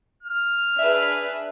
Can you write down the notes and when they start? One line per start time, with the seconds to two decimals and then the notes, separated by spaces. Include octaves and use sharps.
0.23 F6
0.78 D4 G#4 B4 E5